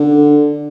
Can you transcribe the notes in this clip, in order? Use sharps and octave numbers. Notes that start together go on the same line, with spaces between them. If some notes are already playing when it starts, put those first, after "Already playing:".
Already playing: D3